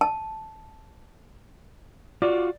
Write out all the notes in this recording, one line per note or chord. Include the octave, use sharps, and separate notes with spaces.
A5
F4 F#4 D5